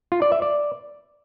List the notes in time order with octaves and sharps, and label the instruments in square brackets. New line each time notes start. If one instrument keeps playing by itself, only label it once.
[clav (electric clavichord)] F4
D5
E5
D5